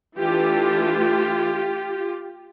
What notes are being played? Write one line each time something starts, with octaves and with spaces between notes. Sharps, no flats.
E3 A3 D4 F4 G4